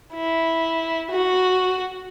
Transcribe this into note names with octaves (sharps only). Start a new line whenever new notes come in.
E4
F#4